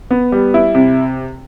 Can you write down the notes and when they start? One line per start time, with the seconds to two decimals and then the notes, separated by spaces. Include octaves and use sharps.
0.11 B3
0.32 G3
0.54 E4
0.75 C3